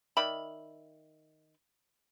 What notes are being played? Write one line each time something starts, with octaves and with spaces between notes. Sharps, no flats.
D#3 D5 E5 B5